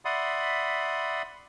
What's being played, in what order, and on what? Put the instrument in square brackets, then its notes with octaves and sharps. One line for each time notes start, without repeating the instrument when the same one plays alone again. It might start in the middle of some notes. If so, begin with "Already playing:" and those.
[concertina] D5 E5 F#5 B5 C6 D#6